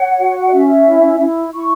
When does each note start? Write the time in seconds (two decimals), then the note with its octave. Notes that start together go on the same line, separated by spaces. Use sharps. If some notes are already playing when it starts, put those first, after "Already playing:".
Already playing: C#5 F#5
0.20 F#4
0.47 D5
0.53 C#4 E5
0.86 E4
1.20 E4
1.53 E4 C#6